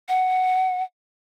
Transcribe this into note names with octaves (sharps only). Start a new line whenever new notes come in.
F#5